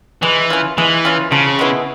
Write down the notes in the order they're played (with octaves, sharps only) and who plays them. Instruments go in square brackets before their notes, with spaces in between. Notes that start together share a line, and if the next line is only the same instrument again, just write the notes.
[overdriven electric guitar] E3 [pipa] G#3
[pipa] C#4 F4
[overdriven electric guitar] E3 [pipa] G#3
[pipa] C#4 F4
[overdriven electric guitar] C#3 [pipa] F3
[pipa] G#3 B3 E4